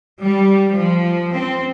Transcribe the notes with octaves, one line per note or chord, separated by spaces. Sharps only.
G3
F3
C4